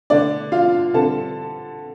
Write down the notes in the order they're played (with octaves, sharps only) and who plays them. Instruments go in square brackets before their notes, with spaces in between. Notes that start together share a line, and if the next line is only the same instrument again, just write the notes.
[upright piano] D3 A3 D4 D5
F4 F5
D3 G3 C4 A4 A5